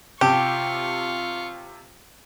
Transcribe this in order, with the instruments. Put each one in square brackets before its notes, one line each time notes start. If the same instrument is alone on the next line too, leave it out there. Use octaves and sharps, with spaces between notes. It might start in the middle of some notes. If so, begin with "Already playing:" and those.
[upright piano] C3 A5 [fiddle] F4 C#6 [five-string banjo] G4